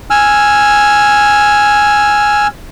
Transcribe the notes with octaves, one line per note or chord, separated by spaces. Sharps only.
G#5 E6 F6